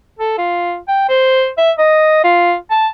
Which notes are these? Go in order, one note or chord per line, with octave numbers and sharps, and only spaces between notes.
A4
F4
G5
C5
E5
D#5
F4
A5